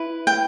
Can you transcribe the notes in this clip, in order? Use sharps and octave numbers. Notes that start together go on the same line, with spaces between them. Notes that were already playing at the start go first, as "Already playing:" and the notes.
Already playing: E4 B4
G5